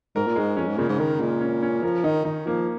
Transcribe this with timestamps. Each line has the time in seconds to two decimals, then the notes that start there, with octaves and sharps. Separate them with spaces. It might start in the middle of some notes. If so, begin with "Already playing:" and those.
0.15 G#2 A#4
0.27 A#2
0.36 G#2 G#3
0.57 F2 C#4
0.68 G#2
0.78 A#2 C#3
0.89 G#2
0.99 D#3 A#4
1.20 A#2 G#3
1.41 C#4
1.63 C#4
1.83 F3 A#4
2.04 D#3 D#4
2.25 D#3 D#4
2.46 F3 A#3